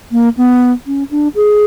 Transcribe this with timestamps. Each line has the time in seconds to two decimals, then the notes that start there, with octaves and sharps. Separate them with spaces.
0.12 A#3
0.37 B3
0.87 C#4
1.11 D4
1.35 G#4